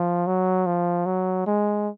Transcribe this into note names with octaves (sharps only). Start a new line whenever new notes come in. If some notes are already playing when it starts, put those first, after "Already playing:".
Already playing: F3
F#3
F3
F#3
G#3